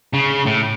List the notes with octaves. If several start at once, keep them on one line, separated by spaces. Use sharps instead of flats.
C#3
A2